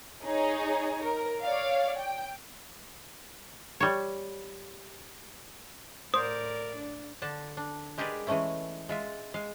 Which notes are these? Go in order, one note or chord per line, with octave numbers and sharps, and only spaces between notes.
D#4 G#4 C#5
A#4
C#5 D5 F5
G5
G3 C#5
A2 A#4 C5 D5 D#6
D4
D3 D4 A5
D4
G#3 G4 G#4 A#4 B4 D5
E3 G#3 A3 C#4 E4
G#3 F4 E5
G#3 F5